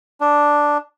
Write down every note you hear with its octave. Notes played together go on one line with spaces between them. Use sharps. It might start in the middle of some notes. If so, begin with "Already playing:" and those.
D4